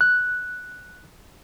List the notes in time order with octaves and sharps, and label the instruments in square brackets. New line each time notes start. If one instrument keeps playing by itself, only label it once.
[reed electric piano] F#6